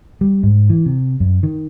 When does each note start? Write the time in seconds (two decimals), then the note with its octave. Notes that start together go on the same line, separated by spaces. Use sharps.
0.21 G3
0.43 G#2
0.70 E3
0.86 C3
1.20 F#2
1.43 D#3